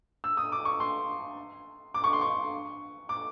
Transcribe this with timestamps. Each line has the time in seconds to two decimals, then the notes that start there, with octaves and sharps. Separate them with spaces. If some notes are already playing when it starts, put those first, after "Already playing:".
0.24 E6
0.37 D#6
0.52 D6
0.65 C#6
0.80 C6
1.94 D6
2.04 C#6
2.13 C6
2.21 C#6
3.09 D6